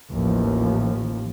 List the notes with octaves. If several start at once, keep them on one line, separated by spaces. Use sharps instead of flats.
A1 D#2 F3